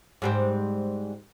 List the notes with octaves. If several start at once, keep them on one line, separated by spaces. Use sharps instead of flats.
G#2 G3 C4